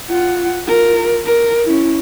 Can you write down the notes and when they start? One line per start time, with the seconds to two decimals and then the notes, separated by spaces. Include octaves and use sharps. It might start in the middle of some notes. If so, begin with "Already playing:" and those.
0.10 F4 F#5
0.67 F4 A#4
1.25 A#4
1.65 C#4 E4